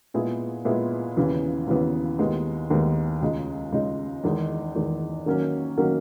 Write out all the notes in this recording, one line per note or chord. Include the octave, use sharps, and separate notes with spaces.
A#2 G#3 B3 E4 G#4
A#2 G#3 B3 E4 G#4
D#2 C#3 E3 B3
D#2 C#3 E3 B3
D#2 D#3 G#3 B3
D#2 D#3 G#3 B3
C#2 C#3 G#3 D#4
C#2 C#3 G#3 D#4
E2 D#3 G#3
E2 D#3 G#3
D#3 F#3 A#3 C#4
D#3 F#3 A#3 C#4